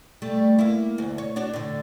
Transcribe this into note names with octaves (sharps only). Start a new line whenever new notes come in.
G3 A3
A#3 E4
D2
C#5
D4 F#4 C#5
A2 D3